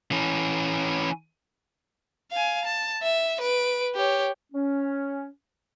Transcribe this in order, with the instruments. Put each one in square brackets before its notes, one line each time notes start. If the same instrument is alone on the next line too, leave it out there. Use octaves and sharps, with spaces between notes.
[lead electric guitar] E3 C#4
[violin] F5 G#5
A5
E5
B4 D7
G4 C#5
[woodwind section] C#4